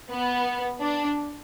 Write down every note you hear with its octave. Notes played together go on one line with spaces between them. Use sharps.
B3
D4